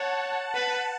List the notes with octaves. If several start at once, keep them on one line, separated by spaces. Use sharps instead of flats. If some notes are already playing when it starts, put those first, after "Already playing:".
Already playing: C#5 F#5 A5
F#5 A5
B4 F#5 A5